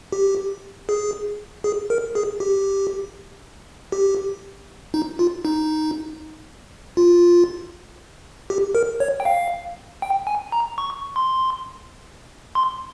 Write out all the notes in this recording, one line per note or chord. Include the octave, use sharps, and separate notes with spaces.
G4
G#4
G#4
A#4
G#4
G4
G4
D#4
F4
D#4
F4
G4
A#4
C#5
G5
F5
G5
G#5
A#5
C#6
C6
C6